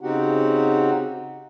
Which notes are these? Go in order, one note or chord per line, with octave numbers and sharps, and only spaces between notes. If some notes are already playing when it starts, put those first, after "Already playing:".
C#3 C4 D#4 F#4 G4 F#5